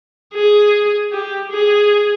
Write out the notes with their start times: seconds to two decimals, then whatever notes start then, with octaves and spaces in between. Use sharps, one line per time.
0.34 G#4
1.12 G4
1.51 G#4